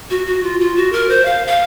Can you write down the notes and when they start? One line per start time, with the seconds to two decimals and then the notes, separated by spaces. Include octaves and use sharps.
0.10 F#4
0.27 F#4
0.43 F4
0.60 F4
0.76 F#4
0.93 A#4
1.09 C5
1.25 F5
1.47 F5